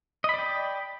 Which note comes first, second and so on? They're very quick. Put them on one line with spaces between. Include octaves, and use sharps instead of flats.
D#5 B5 D5 G5